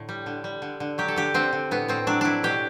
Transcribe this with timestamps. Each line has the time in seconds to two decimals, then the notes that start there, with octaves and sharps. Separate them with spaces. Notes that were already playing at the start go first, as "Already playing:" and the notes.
Already playing: A2 D3
0.09 G3
0.26 D3
0.44 G3
0.62 D3
0.80 D3
0.98 F#3 G4
1.08 A4
1.16 D3 G4
1.34 D3 C4
1.53 D3
1.71 A2 B3
1.88 A2 C4
2.07 F#3 D4
2.21 A2 D4 E4
2.43 B2 G4